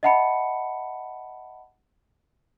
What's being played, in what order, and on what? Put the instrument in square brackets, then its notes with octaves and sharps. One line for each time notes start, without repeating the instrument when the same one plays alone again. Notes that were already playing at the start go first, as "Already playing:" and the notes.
[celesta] D#5 E5 F#5 A5 B5 C#7